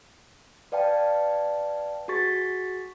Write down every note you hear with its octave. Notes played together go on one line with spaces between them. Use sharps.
B4 D5 F5 G5 A5
F#4 G#4 C#6 A6 B6